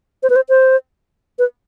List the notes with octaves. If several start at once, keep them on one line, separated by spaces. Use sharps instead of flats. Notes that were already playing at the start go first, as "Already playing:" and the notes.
C5
B4
C5
C5
B4